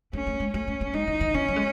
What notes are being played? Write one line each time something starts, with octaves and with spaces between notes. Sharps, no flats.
A3 C#4
A3
G#3
A3 C#4
A3
A3
G#3 D#4
E3
D#3
E3 C#4
F#3
G#3